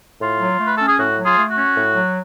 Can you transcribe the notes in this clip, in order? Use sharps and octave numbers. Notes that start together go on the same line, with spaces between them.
A2 F4
F#3
A3
B4
C#4 A4
G#4
A2 F#4
F#3
F4 G#4
A3
F#4
C#4
A2
F#3